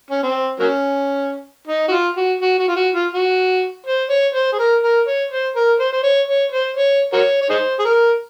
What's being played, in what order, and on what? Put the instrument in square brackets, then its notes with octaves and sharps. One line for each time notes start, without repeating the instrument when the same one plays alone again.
[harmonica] C#4
C4
F#3 A#3 C#4
D#4
F#4
F4
F#4
F#4
F#4
F4
F#4
F4
F#4
C5
C#5
C5
G#4
A#4
A#4
C#5
C5
A#4
C5
C5
C#5
C#5
C5
C#5
F#4 A#4 C#5
C#5
D#4 G#4 C5
G#4
A#4